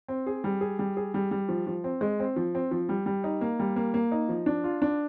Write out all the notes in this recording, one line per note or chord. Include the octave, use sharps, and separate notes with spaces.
C4
G#4
G3
G#4
G3
G#4
G3
G3
F3
F3
C4
G#3
C4
F3
C4
F3
G3
G3
D#4
A#3
G3
A#3
A#3
D#4
F3
D4
F4
D4